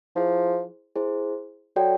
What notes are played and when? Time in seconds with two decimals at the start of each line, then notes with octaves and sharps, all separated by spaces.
0.16 F3 E4 G#4 C5
0.96 E4 G#4 C5
1.76 F#3 F#4 A4 D5 G5